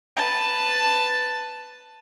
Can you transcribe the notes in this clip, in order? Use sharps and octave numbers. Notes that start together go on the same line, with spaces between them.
B4 A5